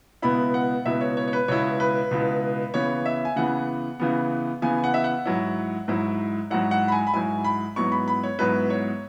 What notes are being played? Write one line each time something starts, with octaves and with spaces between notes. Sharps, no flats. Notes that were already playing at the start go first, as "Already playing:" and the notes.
C#2 B2 B3 E4 B5
F#5
C#2 B2 B3 E4 E5
C#5
C#5
C#5
B4
C#2 B2 B3 E4 C#5
B4
C#2 B2 B3 E4
C#3 E3 B3 C#5
E5
G#5
C#3 E3 B3 F#5
C#3 E3 B3
C#3 E3 B3 G#5
F#5
E5
F#5
G#2 F#3 E4
G#2 F#3 E4
G#2 F#3 E4 F#5
F#5
B5
G#5
B5
G#2 F#3 E4 G#5
B5
G#2 F#3 B3 E4 C#6
B5
B5
C#5
G#2 F#3 B3 E4 B4
C#5